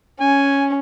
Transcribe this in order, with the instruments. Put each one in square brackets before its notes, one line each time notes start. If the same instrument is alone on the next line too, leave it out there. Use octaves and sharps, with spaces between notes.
[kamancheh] C#4 [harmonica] G#5